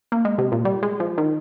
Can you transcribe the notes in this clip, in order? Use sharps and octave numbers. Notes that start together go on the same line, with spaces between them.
A#3
G#3
C3
A#2
G3
G#3
F3
D#3